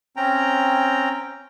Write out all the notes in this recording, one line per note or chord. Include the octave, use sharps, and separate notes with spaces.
C4 C#4 G5 A#5